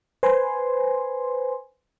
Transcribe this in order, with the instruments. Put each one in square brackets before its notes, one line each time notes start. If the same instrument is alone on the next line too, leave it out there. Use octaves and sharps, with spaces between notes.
[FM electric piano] B4 C5 G#5 C6